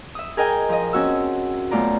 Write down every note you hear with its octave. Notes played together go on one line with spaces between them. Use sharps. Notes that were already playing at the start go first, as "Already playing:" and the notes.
E5 D#6
G#4 A#4 D#5 G5 G#5
F3 D#5
C4 C#4 F#4 E6
F#2 B2 A3 F4 D5 A#5